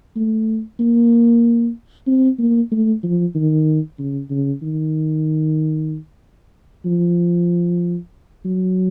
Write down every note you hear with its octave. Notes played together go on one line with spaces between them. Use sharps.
A3
A#3
C4
A#3
A3
F3
D#3
C#3
C#3
D#3
F3
F#3